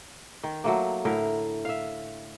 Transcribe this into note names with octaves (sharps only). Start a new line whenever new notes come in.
D#3
F#3 A3 A#3
A2 D3 E4 A#4
E5 F5